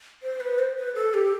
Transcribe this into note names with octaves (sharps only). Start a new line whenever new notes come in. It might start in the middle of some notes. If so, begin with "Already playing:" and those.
C5
B4
C5
B4
A4
G4